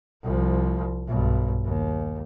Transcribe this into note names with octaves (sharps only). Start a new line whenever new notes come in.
C2 F3
B1 G2
D#2